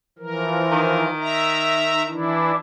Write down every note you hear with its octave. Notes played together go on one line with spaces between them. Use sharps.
E3 F3 A#4
D#3
E5 A#5
E3 D4 E4